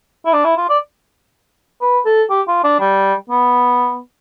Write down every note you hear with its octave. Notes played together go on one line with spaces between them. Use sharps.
E4
D4
E4
F4
D5
B4
A4
G4
F4
D4
G3
B3